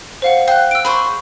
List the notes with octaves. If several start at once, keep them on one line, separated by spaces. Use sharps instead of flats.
C5 F5 F#5
F5 G5 F#6
E6 D7
G#4 C5 B5 C#6